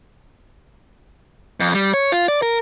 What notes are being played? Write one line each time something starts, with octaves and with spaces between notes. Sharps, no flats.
F2
G3
C#5
F4
D5
A#4